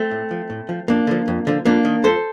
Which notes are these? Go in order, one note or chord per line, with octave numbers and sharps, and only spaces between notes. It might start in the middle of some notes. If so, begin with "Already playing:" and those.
Already playing: A3 C4
A2
F3
A2
F3
F2 A#3 D4
D3 F3
F2
D3 F3
F2 A#3 D4
D#3
F2 A4 C5